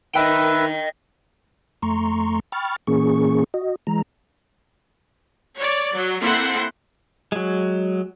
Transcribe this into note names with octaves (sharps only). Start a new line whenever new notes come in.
D#3 B4 D#5 E5 G5
F2 A3 A#5 C6 C#6
G5 B5 C#6 F6 A6
A#2 E3 A#3 C#4 G#4 C#6
F#4 D#5
E3 G#3 A#5
C#5 D5
F#3
A#3 C4 E4 A4 F#5 C6
F#3 G#3